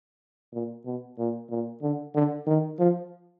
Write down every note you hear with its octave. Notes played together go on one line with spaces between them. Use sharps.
A#2
B2
A#2
A#2
D3
D3
D#3
F3